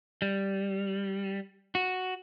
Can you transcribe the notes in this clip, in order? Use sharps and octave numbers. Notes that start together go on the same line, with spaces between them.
G3
F#4